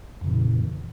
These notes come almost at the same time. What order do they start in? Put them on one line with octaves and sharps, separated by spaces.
F2 C#3 A#2 E3